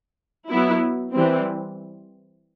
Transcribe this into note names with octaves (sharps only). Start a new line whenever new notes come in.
F#3 B3 E4
E3 G3 C4